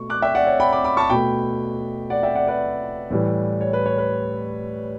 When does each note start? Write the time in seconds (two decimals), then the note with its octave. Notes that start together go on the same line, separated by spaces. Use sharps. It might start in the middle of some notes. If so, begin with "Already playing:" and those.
Already playing: B2 A3 C#6
0.10 D6 F#6
0.22 E5 G5
0.35 D5 F#5
0.47 C#5
0.60 G5 B5
0.72 B5 D6
0.84 B5 D6
0.97 A5 C#6
1.10 B2 A3 G5 B5
2.10 D5 F#5
2.23 E5 G5
2.35 D5 F#5
2.47 B4 D5
3.11 A2 E3 G3
3.61 C#5
3.73 B4
3.86 C#5
3.98 B4